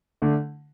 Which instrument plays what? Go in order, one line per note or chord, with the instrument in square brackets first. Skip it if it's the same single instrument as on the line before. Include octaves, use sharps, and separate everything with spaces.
[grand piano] D3 A3 D4